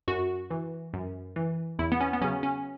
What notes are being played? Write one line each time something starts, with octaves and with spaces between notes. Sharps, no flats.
F#2 F#4
E3
F#2
E3
E2 E4
B3
C#4
B3
C#3 F#3 C#4
C#4